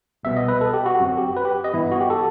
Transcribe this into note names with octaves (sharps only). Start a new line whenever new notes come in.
C2 B2 G3 B3 E5
D#5
B4
A4
G4
F#4
G1 F#2 F#3 C4 F#4
G4
B4
G4
D#5
G2 E3 B3 E4
F#4
G4
A4